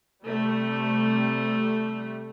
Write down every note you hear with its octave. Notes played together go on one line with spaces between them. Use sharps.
C3 G3 A3